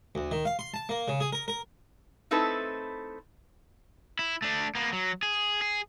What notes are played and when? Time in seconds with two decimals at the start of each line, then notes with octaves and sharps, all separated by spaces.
0.15 D2
0.31 D#3
0.45 F5
0.59 C6
0.74 A5
0.89 A#3
1.08 C#3
1.20 G#4
1.33 A#4
1.48 A#4
2.31 A3 C4 D#4 E4 A4 B4
4.19 E4
4.42 A3 D4
4.75 A#3 B3
4.93 F#3
5.23 G#4
5.62 G#4